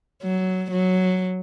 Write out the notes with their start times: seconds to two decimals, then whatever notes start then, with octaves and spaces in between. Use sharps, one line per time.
0.23 F#3
0.71 F#3